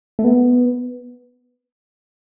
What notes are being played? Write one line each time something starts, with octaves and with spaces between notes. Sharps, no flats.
A3
B3